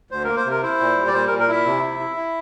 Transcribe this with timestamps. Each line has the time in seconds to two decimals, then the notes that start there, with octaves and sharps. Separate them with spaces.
0.11 D2 C5
0.24 A#3 A#4
0.37 C5
0.45 C3 A#4
0.63 E4 C5
0.80 A#2
0.97 G3
1.07 D5
1.13 A#2 C5
1.27 A#4
1.31 A#2
1.39 A#4
1.48 E4 E5
1.66 C3
1.83 E4
2.00 E4
2.16 E4